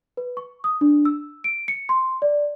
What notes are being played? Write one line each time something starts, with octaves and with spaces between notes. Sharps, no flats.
B4
C#6
D#6
D4
E6
D7
C#7
C6
D5